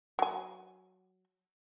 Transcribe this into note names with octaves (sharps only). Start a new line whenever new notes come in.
F#3 G#5